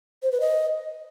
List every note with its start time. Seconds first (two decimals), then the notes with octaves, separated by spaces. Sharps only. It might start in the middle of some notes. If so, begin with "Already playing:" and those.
0.22 C5
0.31 B4
0.40 D#5